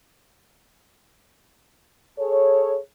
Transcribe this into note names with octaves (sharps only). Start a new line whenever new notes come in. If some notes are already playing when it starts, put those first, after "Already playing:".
G#4 A4 C#5